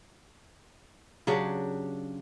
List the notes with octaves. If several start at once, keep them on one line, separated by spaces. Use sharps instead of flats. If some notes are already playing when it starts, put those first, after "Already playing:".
C#3 F#3 D4 G4